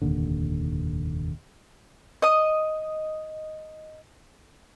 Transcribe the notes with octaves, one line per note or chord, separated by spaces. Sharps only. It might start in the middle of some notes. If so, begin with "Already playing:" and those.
F1 D#2 A#2 D3
D#5 D#6